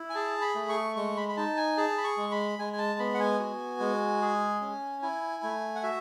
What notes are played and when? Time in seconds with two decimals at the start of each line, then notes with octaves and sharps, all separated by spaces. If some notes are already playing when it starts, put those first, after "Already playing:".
Already playing: E4
0.10 G#5
0.15 G#4 A5
0.41 B5
0.55 A3
0.69 C#6
0.96 G#3 C#6
1.17 B5
1.29 B5
1.37 D#4 A5
1.57 G#5
1.78 G#4 A5
1.98 B5
2.04 C#6
2.17 G#3
2.31 B5
2.59 G#3 G#5
2.73 G#5
2.78 A5
2.99 B3 B5
3.14 F#5
3.20 G#5
3.40 F#4
3.80 G#3
4.21 G#4
4.61 C#4
5.02 E4 G#5
5.43 A3
5.75 F#5
5.83 F#4 E5